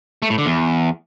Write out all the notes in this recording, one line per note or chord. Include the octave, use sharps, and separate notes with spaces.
A3
A2
D3
E2